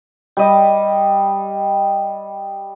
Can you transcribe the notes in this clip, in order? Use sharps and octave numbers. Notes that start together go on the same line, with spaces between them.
G3 D#5